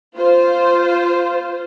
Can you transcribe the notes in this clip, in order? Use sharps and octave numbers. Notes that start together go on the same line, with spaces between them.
F4 C5